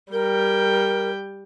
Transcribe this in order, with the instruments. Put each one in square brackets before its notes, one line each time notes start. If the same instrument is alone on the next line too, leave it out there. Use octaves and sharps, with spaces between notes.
[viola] G3 G5 [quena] A#4